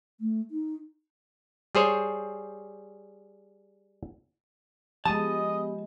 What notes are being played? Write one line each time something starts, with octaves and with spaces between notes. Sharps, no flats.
A3
D#4
G3 G#4 C5 C#5
F3 G#3 B3 G4 D#5 A5